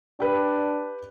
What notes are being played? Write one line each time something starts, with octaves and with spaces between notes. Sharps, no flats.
D4 G4 B4